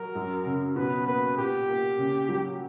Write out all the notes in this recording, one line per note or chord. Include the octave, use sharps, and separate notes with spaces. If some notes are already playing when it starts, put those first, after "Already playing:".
Already playing: F#3 A#4
F#2
C#3
B2 B4
A#3 B4
A#2 G4
A#3
C#3
F#3